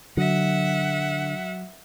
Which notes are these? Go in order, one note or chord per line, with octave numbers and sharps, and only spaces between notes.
D3 F#3 E5 F#5